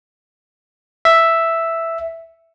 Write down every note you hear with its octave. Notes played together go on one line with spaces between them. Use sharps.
E5